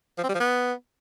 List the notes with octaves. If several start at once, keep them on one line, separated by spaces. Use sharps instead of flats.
F3
C4
G3
F3
B3